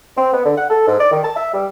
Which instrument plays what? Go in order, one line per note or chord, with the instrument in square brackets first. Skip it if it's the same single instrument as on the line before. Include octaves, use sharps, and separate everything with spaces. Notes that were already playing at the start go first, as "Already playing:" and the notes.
[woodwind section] C4
B3
D3
F#5
A4
G#2
D5
D#3
A5
E5
G3